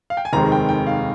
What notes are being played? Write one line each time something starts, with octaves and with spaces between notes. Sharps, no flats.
F5
G5
G#5
F1 D#2 D#3 G#3 C4 A#5
G5
G5
F5